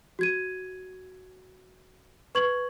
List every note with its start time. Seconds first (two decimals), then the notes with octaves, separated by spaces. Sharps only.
0.19 F#4 G#6 D#7
2.35 B4 C#6 G#6 F#7